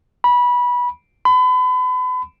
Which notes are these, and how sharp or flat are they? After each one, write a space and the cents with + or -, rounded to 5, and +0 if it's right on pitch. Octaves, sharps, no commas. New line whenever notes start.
B5 -20
B5 +35